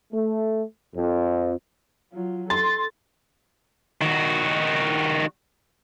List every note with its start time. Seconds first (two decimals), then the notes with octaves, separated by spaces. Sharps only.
0.13 A3
0.95 F2
2.14 F#3 F4
2.50 A4 C6 A6
4.02 D#3 F#4